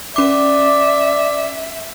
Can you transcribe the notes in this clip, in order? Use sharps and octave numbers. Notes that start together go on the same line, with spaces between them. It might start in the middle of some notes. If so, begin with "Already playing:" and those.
C#4 D5 E5 D6